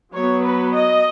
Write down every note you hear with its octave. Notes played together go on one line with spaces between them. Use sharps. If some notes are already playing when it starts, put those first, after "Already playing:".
F#3 B3 C#5
B4
D#5